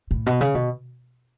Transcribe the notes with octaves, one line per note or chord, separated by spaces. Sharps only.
A2
B2
C#3
B2